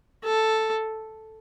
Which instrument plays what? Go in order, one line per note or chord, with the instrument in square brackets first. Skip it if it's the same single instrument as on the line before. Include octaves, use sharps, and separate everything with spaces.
[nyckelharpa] A4